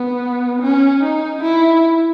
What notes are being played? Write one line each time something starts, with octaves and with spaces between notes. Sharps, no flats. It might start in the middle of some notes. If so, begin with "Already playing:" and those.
Already playing: B3
C#4
D#4
E4